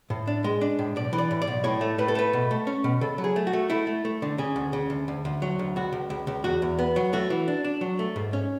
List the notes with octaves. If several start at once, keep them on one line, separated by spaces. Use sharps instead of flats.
A2
D4
G#3
D4
A2
B1 D5
E3
D5
A2
D5
B1
A2 C#5
A3
A2 B4
A4
A3 B4
B2
A3
C#4
B2
C#3 A4
F#3
G#4
A3
F#4
A3
A3 E4
A3
A3
D3
C#3 G#4
D2
C#3
D2
D2
D2
F#3
D2
C#2 F#4
C#2
C#2
C#2
E2 F#4
E2
B3
F#3
A3 F#4
E3
D4
D4
F#3
A3
G#2
C#4